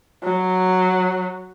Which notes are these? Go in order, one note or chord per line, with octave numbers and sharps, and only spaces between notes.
F#3